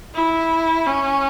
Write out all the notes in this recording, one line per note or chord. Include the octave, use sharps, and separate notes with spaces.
E4
C#4